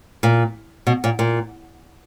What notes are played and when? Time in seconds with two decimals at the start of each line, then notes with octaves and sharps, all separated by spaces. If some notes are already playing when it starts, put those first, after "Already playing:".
0.23 A#2
0.87 B2
1.04 A#2
1.19 A#2